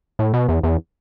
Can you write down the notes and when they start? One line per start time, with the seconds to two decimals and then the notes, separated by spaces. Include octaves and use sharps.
0.19 A2
0.33 B2
0.48 E2
0.63 E2